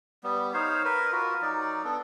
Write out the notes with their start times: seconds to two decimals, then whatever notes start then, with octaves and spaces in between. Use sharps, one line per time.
0.24 G3 B3
0.54 D#4 C5 C#5 F5
0.85 A#4 B4
1.12 F4 F#4 A#4
1.42 F#3 D#4 D5
1.84 B3 D4 A4